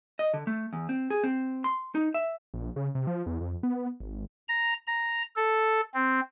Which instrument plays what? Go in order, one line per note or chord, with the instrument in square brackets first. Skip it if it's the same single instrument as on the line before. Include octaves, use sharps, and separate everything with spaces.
[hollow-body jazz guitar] D#5
D3
A3
E2
C4
G#4
C4
C6
D#4
E5
[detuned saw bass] A#1
C#3
C3
F3
E2
F2
B3
G#1
[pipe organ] A#5
A#5
A4
C4